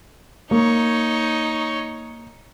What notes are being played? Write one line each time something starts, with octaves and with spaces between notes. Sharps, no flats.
A#3 D#4 C#5